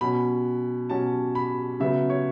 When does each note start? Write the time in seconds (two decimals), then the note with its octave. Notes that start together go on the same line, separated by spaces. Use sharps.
0.01 B2 F#3 C#4 B5
0.90 B2 F#3 C#4 A5
1.35 B5
1.80 C#3 F#3 B3 E5
2.10 C#5